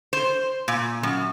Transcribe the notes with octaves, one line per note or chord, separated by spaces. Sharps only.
C5
A#2
F#2